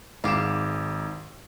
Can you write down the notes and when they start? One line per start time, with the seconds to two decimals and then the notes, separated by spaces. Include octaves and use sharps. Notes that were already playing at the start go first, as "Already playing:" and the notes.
0.24 G#1 G#2 G4 F5 E7